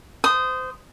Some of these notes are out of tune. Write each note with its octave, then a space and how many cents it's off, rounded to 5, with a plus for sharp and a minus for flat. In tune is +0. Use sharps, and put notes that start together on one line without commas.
C5 -25 D#6 +0